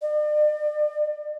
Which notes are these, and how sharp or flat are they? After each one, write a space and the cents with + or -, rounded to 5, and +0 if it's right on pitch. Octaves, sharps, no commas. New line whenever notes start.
D5 +40